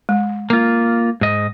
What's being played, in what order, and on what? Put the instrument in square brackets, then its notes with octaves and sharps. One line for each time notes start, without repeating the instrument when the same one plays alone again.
[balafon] G#3
[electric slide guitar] A#3 F4
G#2 D#5